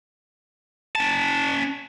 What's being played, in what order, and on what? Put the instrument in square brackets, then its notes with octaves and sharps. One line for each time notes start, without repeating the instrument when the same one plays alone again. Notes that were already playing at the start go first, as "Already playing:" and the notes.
[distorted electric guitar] C#4 A5